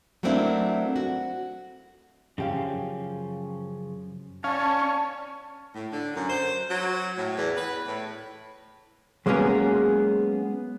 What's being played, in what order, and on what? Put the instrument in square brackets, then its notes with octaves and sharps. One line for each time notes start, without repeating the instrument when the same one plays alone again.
[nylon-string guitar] F#3 A3 A#3 C4 D4 E4
F#4
[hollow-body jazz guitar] F#2 G4 F5 [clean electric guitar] C#3 F3 C#4
[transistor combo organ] C#4 [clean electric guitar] D5 F5 [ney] A5
[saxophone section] A2
D3
F#2
C5
F#3
A2
E2
B4
A2
[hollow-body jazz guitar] F#3 G#3 A#3 B3 C#4 G#4